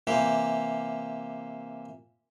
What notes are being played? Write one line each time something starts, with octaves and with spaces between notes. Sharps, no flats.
C3 E3 A#3 G4